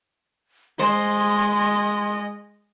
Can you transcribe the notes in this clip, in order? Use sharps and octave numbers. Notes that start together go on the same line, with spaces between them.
G#3 C5 D#5 C6